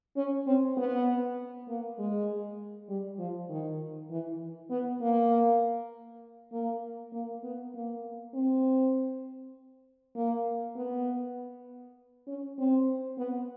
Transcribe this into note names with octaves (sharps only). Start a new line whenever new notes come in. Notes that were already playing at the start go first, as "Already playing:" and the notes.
C#4
C4
B3
A#3
G#3
G3
F3
D#3
E3
B3
A#3
A#3
A#3
B3
A#3
C4
A#3
B3
C#4
C4
B3